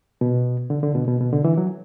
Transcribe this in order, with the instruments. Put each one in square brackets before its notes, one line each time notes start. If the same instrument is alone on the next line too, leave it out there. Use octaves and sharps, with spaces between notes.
[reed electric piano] B2
D3
D3
B2
B2
B2
D3
E3
F#3